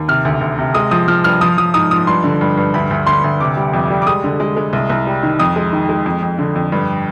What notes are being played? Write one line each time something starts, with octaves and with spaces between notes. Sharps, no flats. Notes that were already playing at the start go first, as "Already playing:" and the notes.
Already playing: D#2
C3 F6
D2
D2
C3
G#3 D#6
F3 D#6
F3 F6
G2 F6
F3 D#6
F3 D#6
G#2 D#6
F3 D#6
G2 C6
D3
G2
G2
D2 B5
D2
D2 C6
D2
C3 D6
G3
F2
G3
D6
G#3 D#6
D3
G#3
G#3
C2
C2
G3
D#3
F2 D#6
G#3
D#3
G#3
F2
F2
D3
F2
G2